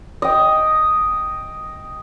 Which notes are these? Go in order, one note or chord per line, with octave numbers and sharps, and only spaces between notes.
D#5 G5